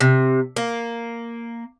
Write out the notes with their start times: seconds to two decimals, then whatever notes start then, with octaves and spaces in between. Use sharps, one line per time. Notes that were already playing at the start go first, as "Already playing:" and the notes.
0.01 C3
0.56 A#3